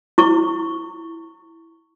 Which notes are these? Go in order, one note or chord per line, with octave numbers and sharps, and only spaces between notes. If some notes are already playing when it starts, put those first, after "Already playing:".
E4 C#6